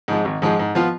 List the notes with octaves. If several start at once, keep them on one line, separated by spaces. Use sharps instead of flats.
G#2 F3 G#3
G#1
G#2 F3 G#3
G#2
F3 B3 F4